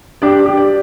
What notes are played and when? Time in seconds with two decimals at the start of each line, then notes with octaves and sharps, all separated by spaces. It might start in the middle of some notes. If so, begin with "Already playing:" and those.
0.22 D4 G4 D5
0.46 G4
0.57 D5